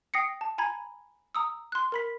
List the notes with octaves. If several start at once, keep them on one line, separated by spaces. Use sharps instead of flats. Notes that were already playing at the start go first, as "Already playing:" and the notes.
G5 D#6 A#6 C7 C#7
A5
G#5 A#5 B5 G#6
A#5 D#6 E6
C6 F#6
A#4 B5 B6